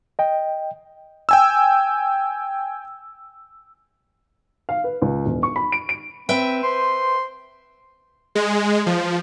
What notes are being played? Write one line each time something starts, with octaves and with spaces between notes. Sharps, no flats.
D#5 G5
G5 G#5 E6
F5
B4
C#2
E1
C#6
B5
D7
D7
C4 B4 E5 G5
C5 C6
G#3
F3